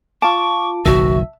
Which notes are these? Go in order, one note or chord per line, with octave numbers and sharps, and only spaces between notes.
F4 A5 C#6 D6
F#1 B1 D#3 F#4 E5